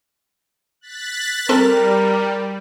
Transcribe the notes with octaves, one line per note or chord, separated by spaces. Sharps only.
F#6 A6 B6
G3 C4 A4 A#4